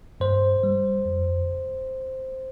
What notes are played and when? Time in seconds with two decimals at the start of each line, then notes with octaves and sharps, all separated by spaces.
0.20 G2 C5
0.63 G3
1.05 F2